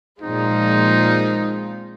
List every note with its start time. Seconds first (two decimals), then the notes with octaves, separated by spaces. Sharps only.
0.21 A#2 F3 G#3 C4 D#4 F4